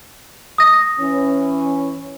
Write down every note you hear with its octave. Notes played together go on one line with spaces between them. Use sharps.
D#6 A#6
E3 C#4